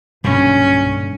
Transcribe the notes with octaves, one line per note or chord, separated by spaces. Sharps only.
B1 G2 A#2 D3 C#4